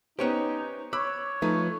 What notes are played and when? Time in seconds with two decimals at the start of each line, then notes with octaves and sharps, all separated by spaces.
0.19 B3 C#4 D#4 G4 C5 C#5
0.93 C#5 B5 D6 E6 F#6
1.42 F3 A3 D#4 B4